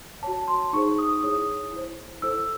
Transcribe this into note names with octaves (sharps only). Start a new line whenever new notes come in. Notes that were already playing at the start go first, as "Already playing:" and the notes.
F#4 C#5 A5
C6
D#4 G#4 C5 C#6
D#6
E4 G#4 C#5 D#6
E4 C5
E4 A4 C5 E6